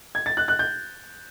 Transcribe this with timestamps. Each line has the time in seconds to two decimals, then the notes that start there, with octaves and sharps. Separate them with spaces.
0.15 G#6
0.26 A6
0.37 F#6
0.48 F#6
0.59 G6